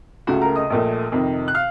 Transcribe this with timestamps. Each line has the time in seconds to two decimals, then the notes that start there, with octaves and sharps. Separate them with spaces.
0.27 C#2 C#3 A3 F#4 F#5
0.41 A#4 A#5
0.56 D#5 D#6
0.70 A#1 A#2 A3
1.12 F2 C3 D#3
1.48 F#6
1.55 F5 F6